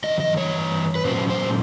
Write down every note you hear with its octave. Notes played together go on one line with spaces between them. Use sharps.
G2 E3 D#5
D#5
C#5
B4
A#2 F#3 A#3 C#4 C5
C5